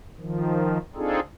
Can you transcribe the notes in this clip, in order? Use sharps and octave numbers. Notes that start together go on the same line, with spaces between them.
D#3 F3
C4 D4 D#4 F4 G#4 A4